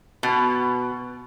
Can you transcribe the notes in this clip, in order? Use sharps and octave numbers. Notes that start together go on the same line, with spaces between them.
B2